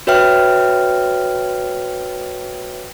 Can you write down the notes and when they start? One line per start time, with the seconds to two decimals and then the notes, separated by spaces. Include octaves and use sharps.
0.07 F#4 B4 C#5 E5 G5 F6